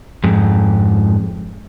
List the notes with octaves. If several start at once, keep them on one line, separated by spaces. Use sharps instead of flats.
F2 G#2